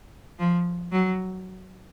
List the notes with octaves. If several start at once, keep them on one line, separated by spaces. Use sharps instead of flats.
F3
F#3